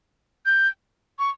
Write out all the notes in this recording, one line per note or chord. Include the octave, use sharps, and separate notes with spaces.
G6
C#6